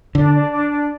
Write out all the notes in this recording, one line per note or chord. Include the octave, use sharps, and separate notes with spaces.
D3 D4
D4
D4
D4